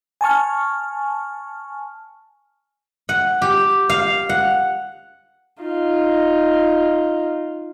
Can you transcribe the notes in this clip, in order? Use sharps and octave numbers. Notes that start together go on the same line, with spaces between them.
G#5 A5 C#6 F6
F#5
G4
F5
F#5
D#4 F4